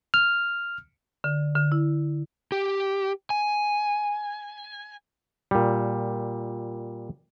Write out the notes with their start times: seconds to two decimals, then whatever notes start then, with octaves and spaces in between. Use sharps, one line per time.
0.14 F6
1.24 D3
1.55 D3
1.72 E4
2.52 G4
3.30 G#5
5.51 A#2 G3